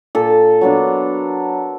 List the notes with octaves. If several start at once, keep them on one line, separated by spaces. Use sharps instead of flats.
A#2 A4
F#3 B3 D4